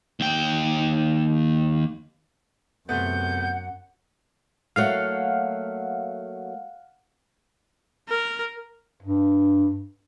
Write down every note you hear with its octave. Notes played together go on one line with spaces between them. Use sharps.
D#2 G5
F#2 C3 A3 B3 F#5 G6
F#3 A3 A#3 F5 F#5
A#4
G2